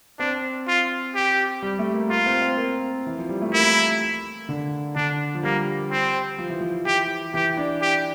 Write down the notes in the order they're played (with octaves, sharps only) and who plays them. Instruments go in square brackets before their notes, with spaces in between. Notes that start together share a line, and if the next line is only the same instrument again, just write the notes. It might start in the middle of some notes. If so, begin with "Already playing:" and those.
[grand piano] C4 [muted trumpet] D4
[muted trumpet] F4
G4
[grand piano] G3
A3
A#3
[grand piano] A#3 [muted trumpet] F4
[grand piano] C4
C4
A#3
E3
F3
G3
A3
[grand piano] A#3 [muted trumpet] E4
[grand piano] D3
[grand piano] D3 [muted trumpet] D4
[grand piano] F3
[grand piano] G3 [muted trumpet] A#3
[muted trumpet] C4
[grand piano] F3
E3
F3
[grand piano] E3 [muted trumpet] G4
[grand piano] E3 [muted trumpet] G4
[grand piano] D4
[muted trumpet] G4